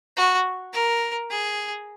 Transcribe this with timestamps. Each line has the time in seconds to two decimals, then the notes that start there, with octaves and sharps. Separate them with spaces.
0.17 F#4
0.73 A#4
1.30 G#4